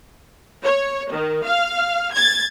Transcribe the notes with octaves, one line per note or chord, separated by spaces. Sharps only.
C#5
D#3
F5
G#6 A6